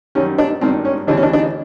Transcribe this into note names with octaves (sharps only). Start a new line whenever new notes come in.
F#2 D#3 G3 C#4
D4
G#1 G2 D#3 C4
C#4
D2 C#3 E3 G3 D4
C#4
D4
D4
D#4